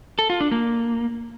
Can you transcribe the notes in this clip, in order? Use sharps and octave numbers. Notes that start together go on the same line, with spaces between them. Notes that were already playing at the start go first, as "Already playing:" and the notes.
A4
F4
D4
A#3